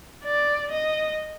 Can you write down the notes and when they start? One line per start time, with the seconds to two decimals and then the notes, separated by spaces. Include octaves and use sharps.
0.25 D5
0.71 D#5